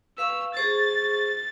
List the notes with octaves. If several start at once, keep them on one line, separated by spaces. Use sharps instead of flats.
B4 F5 C#6 E6
G#4 C5 C#6 A6